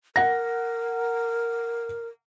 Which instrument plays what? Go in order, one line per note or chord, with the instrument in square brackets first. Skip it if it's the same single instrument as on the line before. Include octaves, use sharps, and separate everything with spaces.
[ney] A#4 [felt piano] F#5 A#6